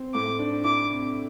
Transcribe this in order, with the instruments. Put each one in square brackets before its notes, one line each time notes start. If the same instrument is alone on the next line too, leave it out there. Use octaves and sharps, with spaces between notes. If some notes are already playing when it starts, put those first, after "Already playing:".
Already playing: [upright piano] C4
[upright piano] A2 [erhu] D6
[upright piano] D4
[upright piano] E4 [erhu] D6
[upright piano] C3